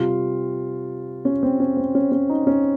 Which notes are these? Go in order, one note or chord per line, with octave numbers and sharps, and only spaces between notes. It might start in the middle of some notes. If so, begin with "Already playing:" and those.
Already playing: C3 G3 F4
C#4
C4
C#4
C4
C#4
C#4
D#4
C#4